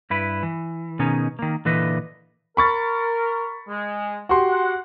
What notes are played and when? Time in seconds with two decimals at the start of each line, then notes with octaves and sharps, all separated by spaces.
0.10 G2 E4 B4
0.43 E3
0.99 B2 D#3 C#4 D#4 G#4
1.39 D#3 A#3
1.65 A#2 D3 E3 B4 D#5
2.57 A#4 B5 C#6 A6
3.69 G#3
4.29 F#4 G4 C6
4.49 F#5